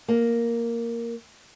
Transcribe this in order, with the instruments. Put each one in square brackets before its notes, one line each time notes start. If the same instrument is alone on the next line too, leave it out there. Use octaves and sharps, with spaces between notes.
[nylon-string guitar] A#3